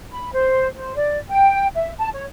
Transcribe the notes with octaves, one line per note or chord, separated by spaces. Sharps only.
B5
C5
C5
D5
G5
E5
A5
C#5